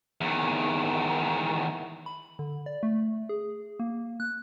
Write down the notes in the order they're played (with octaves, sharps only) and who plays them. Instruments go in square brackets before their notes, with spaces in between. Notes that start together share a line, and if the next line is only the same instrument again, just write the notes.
[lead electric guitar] E2 D#3
[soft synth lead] B5
D3
D5
A3
G#4
A#3
F#6